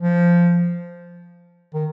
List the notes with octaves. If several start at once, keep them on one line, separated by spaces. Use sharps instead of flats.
F3
D#3